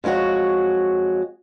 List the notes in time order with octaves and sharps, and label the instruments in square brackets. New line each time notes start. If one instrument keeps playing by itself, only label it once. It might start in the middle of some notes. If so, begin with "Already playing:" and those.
[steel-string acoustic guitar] F2 G#3 D#4 F#4 C#5